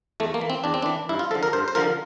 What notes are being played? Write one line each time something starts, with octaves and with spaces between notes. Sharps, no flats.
E2 A3
A#3
E3
C4
E2 D4
C4
D4
E3
G2 E4
F4
D3 F3 A4
A#4
G2 C5
C5
D3 F3 A#4